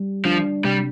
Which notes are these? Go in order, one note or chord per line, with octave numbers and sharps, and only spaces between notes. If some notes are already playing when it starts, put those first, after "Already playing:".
Already playing: G3
F3 D4
C3 G3